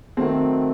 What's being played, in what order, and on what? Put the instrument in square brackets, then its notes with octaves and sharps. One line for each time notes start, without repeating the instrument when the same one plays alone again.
[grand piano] D#3 F#3 A3 C4